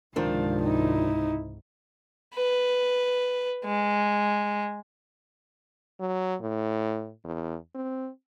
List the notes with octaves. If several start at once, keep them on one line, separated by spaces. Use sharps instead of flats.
C#2 G#2 C3 D#3 F3 D4 F5
D#4 E4
B4
G#3
F#3
A2
E2
C4